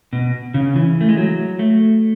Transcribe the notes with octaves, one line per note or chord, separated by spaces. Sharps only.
B2
C#3
E3
A3
G#3
F#3
A3